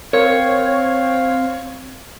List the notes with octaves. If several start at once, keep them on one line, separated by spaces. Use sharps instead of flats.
C4 A#4 C#5 F5